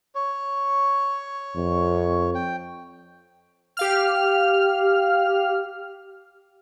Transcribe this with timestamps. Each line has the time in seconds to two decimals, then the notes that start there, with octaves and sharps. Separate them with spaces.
0.15 C#5
1.55 F2
2.35 G5
3.77 G4 F5 F6